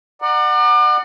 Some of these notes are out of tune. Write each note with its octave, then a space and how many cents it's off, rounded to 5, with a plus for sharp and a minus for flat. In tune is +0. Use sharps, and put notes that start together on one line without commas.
D5 +40 F#5 +0 A#5 +0